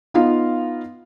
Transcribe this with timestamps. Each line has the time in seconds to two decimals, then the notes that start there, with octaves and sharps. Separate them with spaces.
0.14 B3 D#4 F4 F5